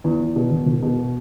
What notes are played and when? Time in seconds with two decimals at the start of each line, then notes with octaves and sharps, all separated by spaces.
0.04 E2
0.20 E2
0.36 B2
0.51 E1
0.66 E1
0.82 B2